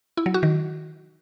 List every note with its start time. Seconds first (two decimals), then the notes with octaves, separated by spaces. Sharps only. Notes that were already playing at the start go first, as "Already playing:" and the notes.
0.17 E4
0.26 F#3
0.34 F#4
0.43 D#3